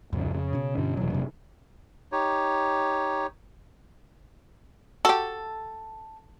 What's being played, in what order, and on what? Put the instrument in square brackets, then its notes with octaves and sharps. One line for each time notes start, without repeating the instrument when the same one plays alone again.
[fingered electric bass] D1 C2 C#3 [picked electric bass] F2
[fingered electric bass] C#3
[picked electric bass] B2 C#4
[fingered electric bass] G2 D3 D4
[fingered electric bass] F1 F#3 [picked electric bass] B2 E3
[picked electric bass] G2 C3
[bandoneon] D#4 G4 C#5
[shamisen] F#4 G4 [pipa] A4